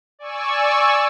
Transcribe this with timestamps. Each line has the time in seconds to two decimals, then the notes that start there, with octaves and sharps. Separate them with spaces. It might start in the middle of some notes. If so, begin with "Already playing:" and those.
0.19 D5 G#5 C#6 E6